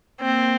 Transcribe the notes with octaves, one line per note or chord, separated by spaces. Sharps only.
A#3 C4